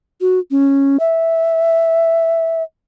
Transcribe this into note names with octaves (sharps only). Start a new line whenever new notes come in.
F#4
C#4
E5